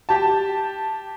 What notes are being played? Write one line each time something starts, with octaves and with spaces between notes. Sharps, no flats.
G4 A5